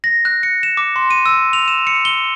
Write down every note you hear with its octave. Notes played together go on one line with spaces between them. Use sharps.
A#6
F#6
C#7
E7
D6
C6
D#7
E6
F7
E7
C#7
G7